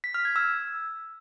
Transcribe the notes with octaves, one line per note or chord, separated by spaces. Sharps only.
B6
F6
G#6
E6